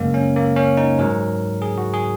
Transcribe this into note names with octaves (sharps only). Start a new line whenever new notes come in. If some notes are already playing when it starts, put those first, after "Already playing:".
Already playing: F#2 C#3 G#3 A#3
C#4
A#3
C#4
D#4
G#2 F#3 A#4
G#4
F#4
G#4